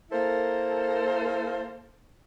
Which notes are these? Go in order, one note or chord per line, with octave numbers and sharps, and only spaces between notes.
A#3 E4 A4 A#4 C5